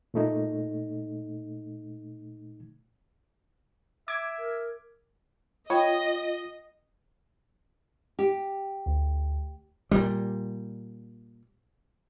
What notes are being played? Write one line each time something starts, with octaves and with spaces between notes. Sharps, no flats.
A#2 A3 D#4
E5 D6 G#6
A#4
F4 C#5 D#5 G5 B5
G4
D2
A#2 G3